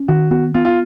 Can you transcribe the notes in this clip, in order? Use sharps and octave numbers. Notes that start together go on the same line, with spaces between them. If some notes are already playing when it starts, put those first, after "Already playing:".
Already playing: C#4
D#3 F#4
B3 F#4
B3 F4
F4